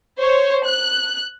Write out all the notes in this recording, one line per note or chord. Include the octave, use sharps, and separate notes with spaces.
C5 C#5
F#6